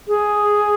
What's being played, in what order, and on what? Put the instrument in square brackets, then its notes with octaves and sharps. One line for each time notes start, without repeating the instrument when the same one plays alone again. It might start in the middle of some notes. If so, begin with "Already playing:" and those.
[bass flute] G#4